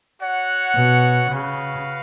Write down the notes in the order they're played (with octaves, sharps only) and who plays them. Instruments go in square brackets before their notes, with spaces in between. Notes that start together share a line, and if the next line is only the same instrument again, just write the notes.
[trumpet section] F#4 C#5 F#5
[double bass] B2
[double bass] C#3 [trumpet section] F#4 B4 F5